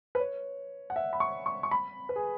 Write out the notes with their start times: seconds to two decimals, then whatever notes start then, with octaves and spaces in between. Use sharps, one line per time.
0.15 B4
0.20 C#5
0.90 F#5
0.96 E5
1.13 B5
1.20 C#6
1.46 C#6
1.63 C#6
1.71 B5
2.09 B4
2.16 G#4